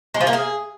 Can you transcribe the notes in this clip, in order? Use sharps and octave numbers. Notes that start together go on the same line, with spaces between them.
G#3
F3
A#3
G#4